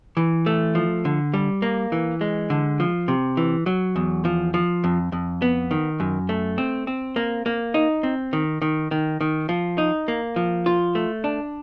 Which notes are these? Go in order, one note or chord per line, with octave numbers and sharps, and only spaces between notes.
E3
A3
F3
D3
G3
A#3
E3
G#3
D3
F3
C3
E3
F#3
E2
F3
F3
F2
F2
B3
D#3
F#2
A3
C4
C4
A#3
A#3
D#4
C4
D#3
D#3
D#3
D#3
F3
D#4
A#3
F3
F4
A3
D4